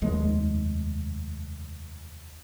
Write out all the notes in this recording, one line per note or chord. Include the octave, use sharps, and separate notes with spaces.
F1 D#2 G#3